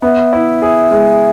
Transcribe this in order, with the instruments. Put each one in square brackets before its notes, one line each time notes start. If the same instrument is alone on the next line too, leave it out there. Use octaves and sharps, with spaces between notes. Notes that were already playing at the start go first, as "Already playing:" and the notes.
[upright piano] B3 [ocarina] E5
[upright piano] E4
G#4
G#3